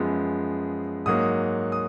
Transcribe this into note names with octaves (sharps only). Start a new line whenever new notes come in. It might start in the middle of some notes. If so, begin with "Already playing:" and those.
Already playing: F#2 F3 G#3 B3
G#2 F#3 A#3 D#6
D#6